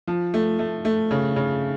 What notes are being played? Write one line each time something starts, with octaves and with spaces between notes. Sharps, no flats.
F3
A3
A3
A3
C#3
C#3